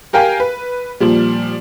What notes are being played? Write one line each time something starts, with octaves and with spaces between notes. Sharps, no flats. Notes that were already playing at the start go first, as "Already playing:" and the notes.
G4 A#4 F5 G5 G#5
B4
A#2 F3 G3